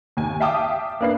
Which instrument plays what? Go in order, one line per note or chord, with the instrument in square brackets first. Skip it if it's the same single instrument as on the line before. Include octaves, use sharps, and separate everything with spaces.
[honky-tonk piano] D#2 G#5
E5 F5 G5 A5 D6 D#6
A#3 D4 B4 C7